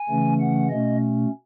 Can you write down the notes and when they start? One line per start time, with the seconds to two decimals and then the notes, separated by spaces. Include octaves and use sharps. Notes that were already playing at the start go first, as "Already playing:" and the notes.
Already playing: G#5
0.09 C#3 E3 A3 C#4
0.40 F#5
0.70 B2 A3 C#4 D#5